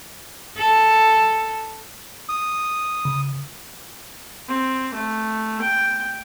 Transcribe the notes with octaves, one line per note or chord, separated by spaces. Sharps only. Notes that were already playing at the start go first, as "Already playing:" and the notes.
A4
D#6
C#3
C4
A3
G5